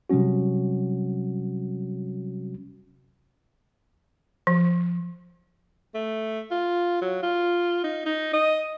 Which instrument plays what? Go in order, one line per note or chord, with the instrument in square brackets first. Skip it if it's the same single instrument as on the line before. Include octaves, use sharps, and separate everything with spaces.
[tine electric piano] C3 F#3 G3 C#4 F#4
[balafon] F3
[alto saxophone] A3
F4
F#3
F4
D#4
D#4
D#5